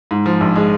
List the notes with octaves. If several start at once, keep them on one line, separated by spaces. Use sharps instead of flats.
G#2
F3
A#1
G#3